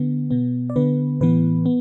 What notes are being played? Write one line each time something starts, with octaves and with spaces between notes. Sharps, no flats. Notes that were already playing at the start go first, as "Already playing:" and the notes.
Already playing: D3 B3
B2 B3
D5
D3 B3 B4
A2 E3 B3 B4
B3